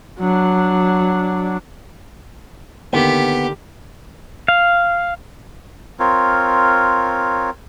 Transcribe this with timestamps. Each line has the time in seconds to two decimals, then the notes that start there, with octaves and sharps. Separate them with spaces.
0.20 F#3 D4
2.93 D3 D#3 A#3 B3 G4
4.48 F5
6.00 C4 F4 A#4 C#5